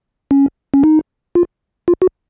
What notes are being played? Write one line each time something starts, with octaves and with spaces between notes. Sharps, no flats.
C#4
C#4
D#4
F4
F4
F#4